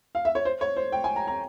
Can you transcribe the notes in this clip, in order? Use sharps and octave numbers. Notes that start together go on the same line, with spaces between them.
F5
E5
C#5
C5
C#5
C5
G5
G#5
A#5
A#5